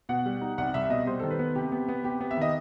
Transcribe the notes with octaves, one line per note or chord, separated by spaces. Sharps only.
B2 F#5
G3
D#4
C2 F#5
C2 E5
B2 D#5
G3 C5
D#3 A4
B4
B3
C3 G4
B3
B3
C3 G4
B3
E5
D#3 D#5